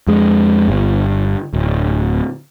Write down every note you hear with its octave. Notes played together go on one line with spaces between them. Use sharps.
F2 G#3
G1
D1